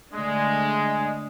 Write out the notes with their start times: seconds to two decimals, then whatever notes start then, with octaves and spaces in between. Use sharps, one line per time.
0.13 D3 G#3 A3 D4